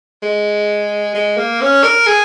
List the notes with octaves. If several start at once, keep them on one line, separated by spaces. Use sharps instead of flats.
G#3
G#3
A#3
C#4
A#4
G#4